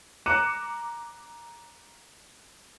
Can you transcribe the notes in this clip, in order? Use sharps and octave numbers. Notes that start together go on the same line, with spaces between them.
A#5 D6 F#6 C#7 D#7 E7